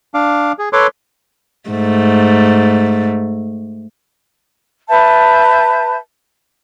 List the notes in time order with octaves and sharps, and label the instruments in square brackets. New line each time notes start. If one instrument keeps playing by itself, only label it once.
[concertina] D4 F5 D6
G#4
A4 B4 C#5 C6 D6
[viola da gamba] G#2 A3
[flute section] B4 E5 A5 G6